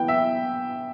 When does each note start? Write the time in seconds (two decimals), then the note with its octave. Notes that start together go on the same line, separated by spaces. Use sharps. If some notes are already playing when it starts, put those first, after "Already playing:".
Already playing: E3 B3 G5
0.08 E5